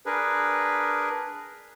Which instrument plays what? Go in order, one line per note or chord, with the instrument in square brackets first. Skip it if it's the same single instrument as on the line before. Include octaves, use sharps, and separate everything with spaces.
[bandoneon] D4 G#4 A#4 B4